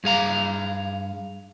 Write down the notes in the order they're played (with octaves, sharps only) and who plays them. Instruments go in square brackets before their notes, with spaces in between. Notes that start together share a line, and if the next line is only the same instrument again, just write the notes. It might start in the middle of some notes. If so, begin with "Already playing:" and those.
[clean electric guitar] G2 G#4 F5 A#5